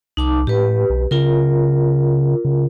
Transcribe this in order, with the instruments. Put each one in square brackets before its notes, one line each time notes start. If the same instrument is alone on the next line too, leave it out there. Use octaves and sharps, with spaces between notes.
[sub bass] C2 [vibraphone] D#4 A5 D6
[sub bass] A2 [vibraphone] G4 B4
[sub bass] B1
[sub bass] C#3 [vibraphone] F4 A#4
[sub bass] C#3